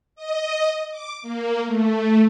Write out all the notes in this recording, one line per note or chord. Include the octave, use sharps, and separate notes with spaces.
D#5
D6
A#3
A3